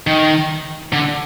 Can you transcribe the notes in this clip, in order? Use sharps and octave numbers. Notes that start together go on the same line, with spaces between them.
D#3
D3